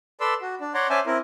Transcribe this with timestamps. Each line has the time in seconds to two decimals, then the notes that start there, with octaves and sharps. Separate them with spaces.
0.21 A4 B4 D5 C6 E6
0.42 F#4
0.61 D4
0.74 C#5 D5 F#5 A#5 C6
0.90 C#4 C5 D5 E5 G#5 A5
1.06 C4 E4 A#4